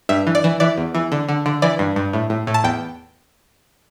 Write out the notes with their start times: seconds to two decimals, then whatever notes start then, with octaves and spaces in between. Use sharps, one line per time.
0.09 G2 E5
0.27 E3
0.35 D5
0.44 E3
0.60 E3 D5
0.78 E2
0.95 E3
1.12 D3
1.29 D3
1.46 D3
1.62 E3 D5
1.79 G2
1.96 G2
2.13 A2
2.30 A2
2.47 A2
2.54 A5
2.64 E2 G5